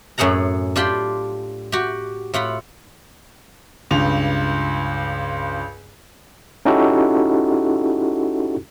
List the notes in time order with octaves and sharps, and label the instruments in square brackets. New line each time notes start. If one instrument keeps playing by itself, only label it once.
[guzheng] F#2 A2 G#4 F#5 A#5
D4 F4 G4 B5 C6
F#4 G4
A2 F4 F#5 B5
[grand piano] C#2 G2 F7
[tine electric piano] C#4 D#4 E4 F#4 G4 A4